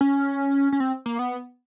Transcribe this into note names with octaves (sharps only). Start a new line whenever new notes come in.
C#4
C#4
C4
A#3
B3